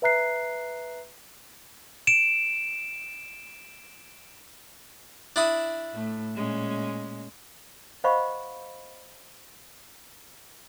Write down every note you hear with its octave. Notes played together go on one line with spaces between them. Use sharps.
B4 E5 A#5 F#6 C7
D7 E7
D4 E4 D#6
A2 A3
A#2 G#3 C#4
C5 D#5 F5 F#5 B5 C#6